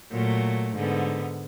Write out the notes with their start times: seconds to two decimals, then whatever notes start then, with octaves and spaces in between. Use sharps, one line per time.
0.11 A#2 F#3 A3
0.75 G#2 D3 B3